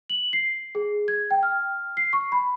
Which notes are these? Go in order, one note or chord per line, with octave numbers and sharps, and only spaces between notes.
F#7
C7
G#4
G#6
G5
F6
C7
C#6
B5